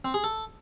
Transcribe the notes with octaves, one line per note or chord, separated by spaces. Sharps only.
C4
G#4
A4